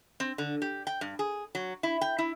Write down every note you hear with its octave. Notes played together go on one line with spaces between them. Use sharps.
C4
D3
G4
G5
G2
G#4
F#3
E4
G5
E4